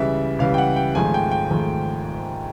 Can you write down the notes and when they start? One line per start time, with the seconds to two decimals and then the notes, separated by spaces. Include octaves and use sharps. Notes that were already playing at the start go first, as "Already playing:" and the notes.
Already playing: C#2 C#3 E3 G3 E5
0.39 C#2 C#3 E3 G3 F5
0.54 G5
0.58 F#5
0.76 G5
0.95 G#1 G#2 F3 A3 G#5
1.14 G5
1.31 G5
1.50 G#1 G#2 F3 A3